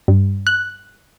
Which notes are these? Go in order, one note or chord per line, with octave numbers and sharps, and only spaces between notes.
G2
F#6